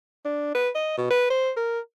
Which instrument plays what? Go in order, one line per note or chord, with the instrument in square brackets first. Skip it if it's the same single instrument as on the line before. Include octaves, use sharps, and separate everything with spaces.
[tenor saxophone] D4
B4
D#5
B2
B4
C5
A#4